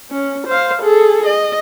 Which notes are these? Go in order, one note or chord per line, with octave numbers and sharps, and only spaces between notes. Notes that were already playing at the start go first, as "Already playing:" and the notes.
C#4
C5 F5
G#4 A4
D#5